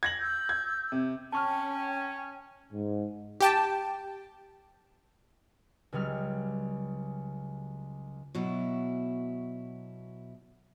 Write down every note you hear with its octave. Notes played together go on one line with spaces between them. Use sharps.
G#6 A#6 F#7
E6 G6
G#6
C3
C#4 G5 A5 C#6 F6
G#2
G4 G5 A5
C#2 C#3 F#3 G3 F6
B2 F#3 E4